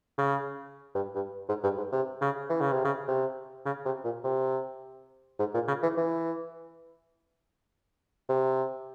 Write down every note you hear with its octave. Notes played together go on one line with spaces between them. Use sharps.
C#3
G2
G2
G#2
G2
G#2
C3
C#3
E3
C#3
C3
C#3
C3
C#3
C3
A#2
C3
G#2
A#2
C#3
E3
E3
C3